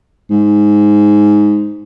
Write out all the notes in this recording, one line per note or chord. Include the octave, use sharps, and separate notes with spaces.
G#2